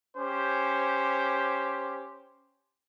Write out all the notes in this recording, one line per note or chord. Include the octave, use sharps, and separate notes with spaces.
C#4 G4 C5